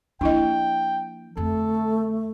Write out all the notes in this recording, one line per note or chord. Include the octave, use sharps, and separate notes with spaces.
F3 A#3 D4 E4 D#5 G5
F2 D3 A3 A4